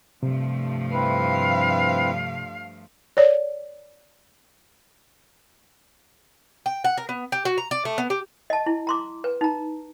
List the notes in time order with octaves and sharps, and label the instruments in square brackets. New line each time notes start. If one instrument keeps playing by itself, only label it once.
[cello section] G2 F3 A3 [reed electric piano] C3
[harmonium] C4 E4 B4 [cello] F5
[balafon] C#5 D5
[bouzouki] G5
F#5
A#4
B3
G4
F#4
A#5
D5
A3
B3
G4
[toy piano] D#5 A5
E4
A#5 C6 D6
B4
D#4 A#5